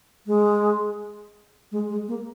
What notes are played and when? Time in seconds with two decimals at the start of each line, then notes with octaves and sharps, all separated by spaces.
0.27 G#3
1.72 G#3
1.89 G#3
2.08 A#3